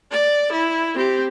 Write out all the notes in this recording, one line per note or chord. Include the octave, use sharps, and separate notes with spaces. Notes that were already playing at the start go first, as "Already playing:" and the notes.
D5
E4
C4 G4